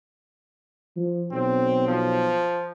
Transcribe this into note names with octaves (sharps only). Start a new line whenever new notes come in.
F3
B1 C4
F3